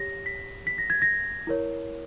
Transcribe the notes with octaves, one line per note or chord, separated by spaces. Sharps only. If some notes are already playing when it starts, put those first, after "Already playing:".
Already playing: G4 C#5 A#6
B6
B6
A#6
G#6
A#6
E4 A#4 C#5